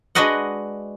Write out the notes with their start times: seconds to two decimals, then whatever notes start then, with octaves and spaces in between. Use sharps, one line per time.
0.15 G#3 D4 F#4 B4 D#5 F#5